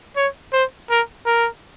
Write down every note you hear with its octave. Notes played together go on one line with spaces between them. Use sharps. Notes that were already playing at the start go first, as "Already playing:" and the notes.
C#5
C5
A#4
A#4